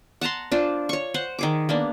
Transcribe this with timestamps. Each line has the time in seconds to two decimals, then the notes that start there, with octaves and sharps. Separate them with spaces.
0.21 F#5 A5 A#5 C6
0.52 D4 F4 C5
0.89 C#5 C#6
1.14 C5 F#5
1.39 D#3 G#4 D6
1.69 A#3 B3 D4